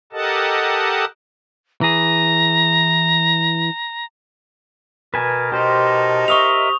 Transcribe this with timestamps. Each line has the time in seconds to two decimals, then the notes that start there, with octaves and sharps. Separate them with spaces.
0.12 G4 A4 A#4 D#5 F#5 A5
1.81 E3 G#4 A#5
5.14 B2 A#4 B4 G#5 A5
5.52 D#4 G4 C5
6.28 A#4 D#5 E5 C#6 D#6 F7